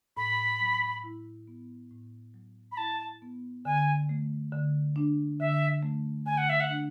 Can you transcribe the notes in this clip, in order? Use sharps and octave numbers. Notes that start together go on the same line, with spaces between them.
A2 B5
F#3
E4
B3
A2
F#3
B5
E4 A5
B3
D3 G#5
A3
D3
D4
D3 E5
A3
D3 G#5
F#5
E5
F#5
D4